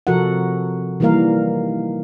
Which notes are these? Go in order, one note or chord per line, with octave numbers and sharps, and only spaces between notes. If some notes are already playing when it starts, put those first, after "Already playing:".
C3 F3 F#4 A4 A#4 F#5
D#3 E3 G3 A#3 A#4 F5